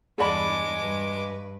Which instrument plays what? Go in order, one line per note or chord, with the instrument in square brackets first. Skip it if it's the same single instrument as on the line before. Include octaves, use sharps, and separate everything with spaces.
[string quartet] E2 G2 D4 [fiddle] G#3 D6 [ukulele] G#4 D5 B5
[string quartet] G2 B4